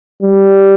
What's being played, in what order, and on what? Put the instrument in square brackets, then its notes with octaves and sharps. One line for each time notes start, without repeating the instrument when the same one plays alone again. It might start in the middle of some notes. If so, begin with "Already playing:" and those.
[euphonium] G3